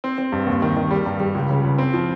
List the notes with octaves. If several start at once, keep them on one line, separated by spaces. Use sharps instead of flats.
C4
C4
G2
D#2
D#3
D#3
G3
G2
G3
C#2
C#3
C#2
C4
F3